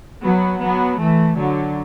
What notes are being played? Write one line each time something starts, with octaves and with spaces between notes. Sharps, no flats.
F#3 B3
F#3 B3
E3 A3
D3 F#3